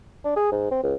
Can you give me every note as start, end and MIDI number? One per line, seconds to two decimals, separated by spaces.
0.25 0.34 62
0.36 0.51 68
0.52 0.67 44
0.71 0.82 60
0.83 0.94 37